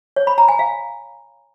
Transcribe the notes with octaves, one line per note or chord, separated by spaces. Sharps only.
C#5
B5
A#5
G#5
F5